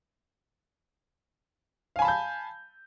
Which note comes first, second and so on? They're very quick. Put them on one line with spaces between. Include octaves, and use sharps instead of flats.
F5 G#5 B5 A5 G6